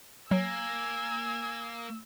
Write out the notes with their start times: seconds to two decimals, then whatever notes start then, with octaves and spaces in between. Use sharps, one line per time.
0.31 F#3 A#3 G#5 E6